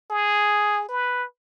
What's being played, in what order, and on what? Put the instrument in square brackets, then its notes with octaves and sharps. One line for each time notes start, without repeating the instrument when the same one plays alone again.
[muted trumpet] G#4
B4